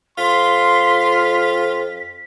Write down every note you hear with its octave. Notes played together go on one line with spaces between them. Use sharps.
F2 F4 C6 B6